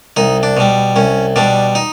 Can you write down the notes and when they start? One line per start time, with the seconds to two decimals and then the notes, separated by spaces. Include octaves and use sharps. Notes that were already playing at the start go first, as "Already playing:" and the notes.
0.17 C2 D#4
0.43 D4
0.57 B2 G3
0.96 C2 C#4
1.36 B2 G3 D4
1.75 D#4